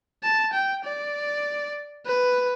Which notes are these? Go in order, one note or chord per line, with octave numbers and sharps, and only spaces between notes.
A5
G5
D5
B4